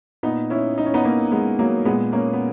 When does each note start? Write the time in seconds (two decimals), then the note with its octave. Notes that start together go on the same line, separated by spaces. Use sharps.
0.23 A#2 B3 D#4
0.50 C#4 E4
0.78 D#4
0.86 C#4
0.94 B3 D#4
1.04 A#3 C#4
1.32 G#3 B3
1.59 F#3 A#3
1.85 A#2 G#3 B3
2.13 A#3 C#4
2.33 B3